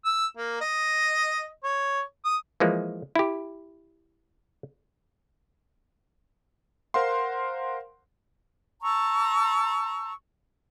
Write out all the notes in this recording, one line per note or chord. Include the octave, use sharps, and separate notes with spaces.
E6
A#3
D#5
C#5
D#6
E3 F3 G#3 A#3
E4 G4
A#4 C5 F5 F#5 C6
A5 A#5 C#6 E6